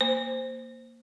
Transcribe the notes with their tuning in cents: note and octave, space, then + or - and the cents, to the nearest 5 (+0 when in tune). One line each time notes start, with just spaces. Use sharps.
A#3 +0 C5 +0